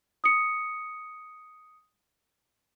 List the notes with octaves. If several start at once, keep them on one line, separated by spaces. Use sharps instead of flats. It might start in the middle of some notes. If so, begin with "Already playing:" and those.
D#6 C#7